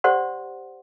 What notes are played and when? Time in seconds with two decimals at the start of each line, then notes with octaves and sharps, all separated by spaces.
0.04 G4 C5 D5 F#5 C6